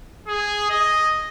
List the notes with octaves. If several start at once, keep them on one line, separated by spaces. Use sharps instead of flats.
G#4
D#5